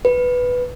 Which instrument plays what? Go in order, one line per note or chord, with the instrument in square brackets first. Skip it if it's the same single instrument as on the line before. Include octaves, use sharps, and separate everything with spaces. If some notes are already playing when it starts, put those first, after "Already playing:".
[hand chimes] B4